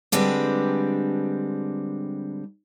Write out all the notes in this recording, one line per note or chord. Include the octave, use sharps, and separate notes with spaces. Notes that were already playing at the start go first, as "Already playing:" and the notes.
D3 G3 G#3 C4 D4 B4